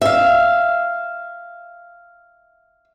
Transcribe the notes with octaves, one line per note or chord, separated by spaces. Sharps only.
E5 F5